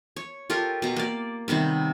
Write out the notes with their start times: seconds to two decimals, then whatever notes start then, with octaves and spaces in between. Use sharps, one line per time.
0.16 C#5
0.50 F4 G4 A4 A#4
0.82 B2 A#5
0.96 A#3 D5
1.48 C3 D#3 G3 B3